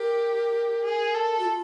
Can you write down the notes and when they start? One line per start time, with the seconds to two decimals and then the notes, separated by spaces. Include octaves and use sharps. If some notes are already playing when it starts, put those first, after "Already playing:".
Already playing: G4 A#4
0.84 G#4
1.14 A4
1.39 F#4
1.45 F4